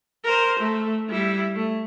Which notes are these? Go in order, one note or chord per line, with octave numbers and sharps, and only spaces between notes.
A#4 C5
A3
G3 E4
A3